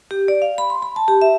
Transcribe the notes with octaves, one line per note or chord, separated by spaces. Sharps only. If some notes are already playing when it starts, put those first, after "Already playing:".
G4
D5
F5
B5
C6
B5
A5
G4
E5